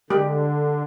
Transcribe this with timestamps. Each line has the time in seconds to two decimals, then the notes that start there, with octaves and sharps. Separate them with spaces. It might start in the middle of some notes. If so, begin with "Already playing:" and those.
0.10 D3 G3 G#3 G4